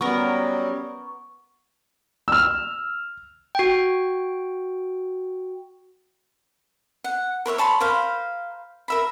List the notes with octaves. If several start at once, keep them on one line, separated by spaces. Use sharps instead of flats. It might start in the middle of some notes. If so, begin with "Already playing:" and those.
F#3 G3 B3 C#4 A#4 C#6
E6 F6
F#4 G5
F#5
A#4 B4 C#5 E5
C#5 A5 B5 C6
A#4 C5 F5 B5
A#4 E5 B5